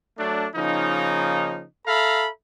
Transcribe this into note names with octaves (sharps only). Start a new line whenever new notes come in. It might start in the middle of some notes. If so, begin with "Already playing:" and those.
F#3 A3 D4
C#3 F3 A#3 D#4
A4 E5 F5 A#5 B5